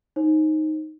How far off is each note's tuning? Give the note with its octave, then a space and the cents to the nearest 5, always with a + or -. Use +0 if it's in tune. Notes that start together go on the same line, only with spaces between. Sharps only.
D#4 +0 C5 +35